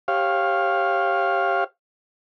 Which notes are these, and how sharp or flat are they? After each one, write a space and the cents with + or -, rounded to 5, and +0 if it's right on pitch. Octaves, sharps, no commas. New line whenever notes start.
G4 +0 C#5 -30 F5 +0